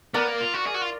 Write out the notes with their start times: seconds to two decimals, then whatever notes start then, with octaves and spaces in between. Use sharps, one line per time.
0.14 B3 A#4 D5
0.27 A#3
0.41 F4
0.54 F#4
0.66 G#4
0.74 F#4
0.82 F4